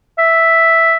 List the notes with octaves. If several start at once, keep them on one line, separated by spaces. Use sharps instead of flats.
E5